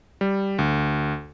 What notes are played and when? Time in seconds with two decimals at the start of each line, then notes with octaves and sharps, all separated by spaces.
0.21 G3
0.59 D2